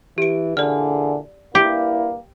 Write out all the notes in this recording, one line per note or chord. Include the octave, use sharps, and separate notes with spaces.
E3 G4 D7
A#2 D3 E3 G#4 D5 F6
G2 A#3 E4 G4